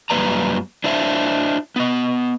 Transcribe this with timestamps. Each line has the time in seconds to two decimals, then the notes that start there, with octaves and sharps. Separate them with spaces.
0.10 F#2 G3 A#3 B4 D5 A#5
0.84 D4 E4 C5 E5
1.76 B3 D#5